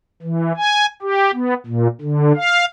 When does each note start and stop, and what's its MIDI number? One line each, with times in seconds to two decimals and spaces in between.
0.22 0.52 52
0.57 0.86 80
1.02 1.31 67
1.33 1.54 59
1.67 1.87 46
2.01 2.32 50
2.36 2.65 77